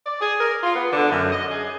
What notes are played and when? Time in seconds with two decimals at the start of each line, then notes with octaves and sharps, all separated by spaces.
0.05 D5
0.20 G#4
0.39 A#4
0.62 F4
0.76 B3
0.93 D3
1.10 F#2
1.32 D#5
1.49 G#4